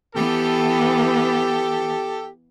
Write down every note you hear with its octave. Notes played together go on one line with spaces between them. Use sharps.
E3 B3 G4 A4